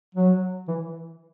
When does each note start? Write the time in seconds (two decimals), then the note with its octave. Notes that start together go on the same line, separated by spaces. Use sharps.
0.15 F#3
0.68 E3